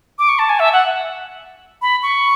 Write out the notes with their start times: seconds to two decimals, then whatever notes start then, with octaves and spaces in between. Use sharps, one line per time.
0.19 D6
0.29 C#6
0.39 A5
0.49 G#5
0.60 E5
0.73 F#5
1.82 B5
2.03 C#6